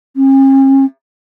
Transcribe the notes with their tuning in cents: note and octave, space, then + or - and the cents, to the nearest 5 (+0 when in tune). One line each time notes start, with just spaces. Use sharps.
C#4 -45